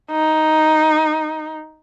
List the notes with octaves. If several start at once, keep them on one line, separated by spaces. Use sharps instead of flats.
D#4